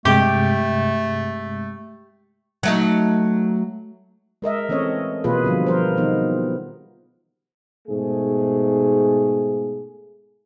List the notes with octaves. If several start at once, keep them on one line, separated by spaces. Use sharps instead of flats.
G2 C3 G#3 A3 G4
F#3 A3 D#4
G#3 A#4 D#5 E5
E3 A3 C4 C#4 C#5 D#5
B2 E3 A#3 F4 G#4 B4
D3 F3 G3
F3 A#4 C5
D#3 F#3 B3 D#4
G#2 B2 A3 G#4